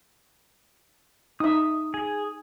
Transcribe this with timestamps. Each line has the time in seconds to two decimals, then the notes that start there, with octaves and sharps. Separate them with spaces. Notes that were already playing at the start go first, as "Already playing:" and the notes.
1.40 D#4 E5 D#6
1.94 G#4